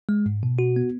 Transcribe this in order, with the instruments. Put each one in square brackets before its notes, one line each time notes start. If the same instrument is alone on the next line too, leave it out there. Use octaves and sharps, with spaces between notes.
[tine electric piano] G#3
G#2
B2
F#4
B3